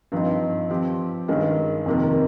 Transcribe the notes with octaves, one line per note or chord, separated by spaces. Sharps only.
G2 F3 C4 D#4
F3 C4 G4
G2 D#3 G#3 C#4
F2 C3 D#3 A#3